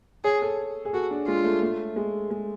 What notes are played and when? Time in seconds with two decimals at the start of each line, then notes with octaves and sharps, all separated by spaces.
0.24 G#4 C#5
0.42 A4
0.85 G#4
0.93 F#4 A4
1.11 D4
1.27 G#3 F4
1.44 A3
1.62 A3
1.96 G#3
2.31 G#3